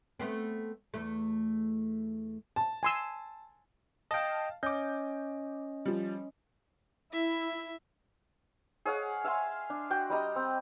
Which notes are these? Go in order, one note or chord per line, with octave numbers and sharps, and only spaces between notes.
A3 B3 C4
E2 A3
A5
G#5 C6 E6
D#5 F5 G5 A5
C#4 D#5 D6 G6
F3 G3
E4 E5
G#4 C#5 F5 F#5
E5 F5 G#5 C6
D4
F#4 G5
G3 D#5 A#5
C4